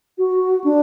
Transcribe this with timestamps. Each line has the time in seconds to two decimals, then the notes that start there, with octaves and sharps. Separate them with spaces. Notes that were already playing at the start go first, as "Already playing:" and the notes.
0.18 F#4
0.64 D4